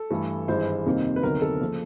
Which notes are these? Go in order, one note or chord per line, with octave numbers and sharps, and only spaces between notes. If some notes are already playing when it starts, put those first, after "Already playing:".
Already playing: A4
G2 E3 A3
G#1 G2 E3 G#3 C5
F2 C3 D#3 G3 A#3
B4
D2 C3 D#3 F#3 B3 A#4
A4
C#3 F3 A#3